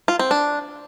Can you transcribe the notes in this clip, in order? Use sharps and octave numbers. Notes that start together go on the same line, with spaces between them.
F4
C4
D4